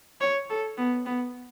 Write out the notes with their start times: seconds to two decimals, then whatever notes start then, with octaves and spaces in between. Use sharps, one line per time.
0.21 C#5
0.50 A4
0.78 B3
1.06 B3